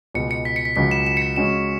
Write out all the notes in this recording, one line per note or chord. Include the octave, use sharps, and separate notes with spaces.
C#2 B2 G#3 C#7
C#7
B6
C#7
B6
C#2 C#3 F#3 B6
E7
E7
C#7
B6
C#3 G#3 C#4 F#4 E7